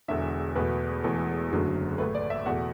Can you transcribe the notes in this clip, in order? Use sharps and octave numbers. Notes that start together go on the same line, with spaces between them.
E1 E2 D3 E5
E2 B2 A3 B4
E1 E2 E3 A3 A4
F#1 F#2 D3 F#3 A3
A1 A2 A3 B4
D5
E5
E2 B2 A3 F#5